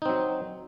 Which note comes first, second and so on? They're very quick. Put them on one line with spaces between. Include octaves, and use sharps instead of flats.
D#4 C4 F#3